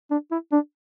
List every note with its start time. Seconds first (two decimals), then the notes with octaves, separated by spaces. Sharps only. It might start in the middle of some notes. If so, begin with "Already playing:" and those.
0.10 D4
0.31 E4
0.52 D4